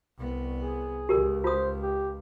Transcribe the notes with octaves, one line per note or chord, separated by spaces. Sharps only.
C2 B3
G#4
C#2 G4 A#4
F4 C5 D#6
G4